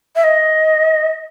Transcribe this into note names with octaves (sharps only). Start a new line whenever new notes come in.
E5
D#5